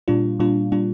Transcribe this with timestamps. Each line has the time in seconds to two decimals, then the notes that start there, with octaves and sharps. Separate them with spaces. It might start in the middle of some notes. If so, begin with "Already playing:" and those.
0.08 A#2 G3 D4 F4
0.40 A#2 G3 D4 F4
0.72 A#2 G3 D4 F4